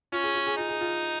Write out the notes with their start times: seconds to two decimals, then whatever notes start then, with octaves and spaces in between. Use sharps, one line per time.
0.12 C#4 F4
0.24 G#4
0.35 F4
0.47 G#4
0.57 D#4 F4
0.69 G#4
0.81 F4